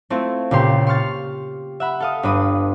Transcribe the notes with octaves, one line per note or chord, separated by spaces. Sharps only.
A3 C4 E4 F4
C#2 A#2 G4 C6 G6
C6 C#6 F6 A6
E5 F#5 B5
A4 F5 D#6
G1 D4 B4 D#6